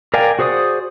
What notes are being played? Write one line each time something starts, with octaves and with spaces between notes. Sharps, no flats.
A#4 D5 F5 G5 G#5
F#4 G#4 C5 D5 D#6